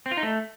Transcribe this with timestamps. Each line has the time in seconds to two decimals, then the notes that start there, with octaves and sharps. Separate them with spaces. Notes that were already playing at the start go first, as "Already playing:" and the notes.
0.06 C4
0.11 F4
0.17 D#4
0.23 A3